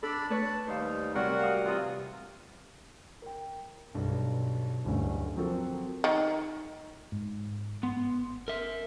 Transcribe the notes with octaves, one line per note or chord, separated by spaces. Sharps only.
D4 A4 D5 B5 D6
A3 B4 C#5 A5
D#2 G3 D#4 C5 F5
C3 F#3 G3 F#4 A#4 F#5
F5 D#6
C3 E3 F4 D#6
A#4 G5
B1 G2
D1 G2 D3 A3 C#4
F3 F#3 C4 F#4 A4 A#4
D#3
G#2
G1 B3 C6
A#4 E5